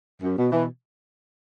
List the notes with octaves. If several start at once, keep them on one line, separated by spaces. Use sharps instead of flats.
F#2
B2
B2 E3